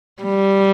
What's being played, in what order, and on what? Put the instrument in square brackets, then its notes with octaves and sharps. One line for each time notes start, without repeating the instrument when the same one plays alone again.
[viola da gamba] G3